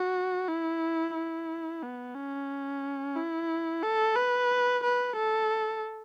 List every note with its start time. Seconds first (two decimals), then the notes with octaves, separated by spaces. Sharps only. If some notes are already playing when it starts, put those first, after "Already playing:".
Already playing: F#4
0.48 E4
1.15 E4
1.82 B3
2.15 C#4
3.15 E4
3.82 A4
4.16 B4
4.83 B4
5.16 A4